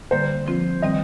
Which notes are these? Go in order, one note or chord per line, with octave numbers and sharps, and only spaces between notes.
D3 G3 A#3 C5
F3 C4 F4
D#3 G3 C4 D#5